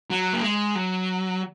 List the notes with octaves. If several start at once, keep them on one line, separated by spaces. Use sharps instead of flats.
F#3
A#3
G#3
F#3